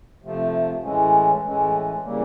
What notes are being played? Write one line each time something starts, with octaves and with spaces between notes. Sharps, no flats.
C3 F3 A3
A2 E3 G#3 C#4
A2 E3 G#3 C#4
C#3 E3 G3 A#3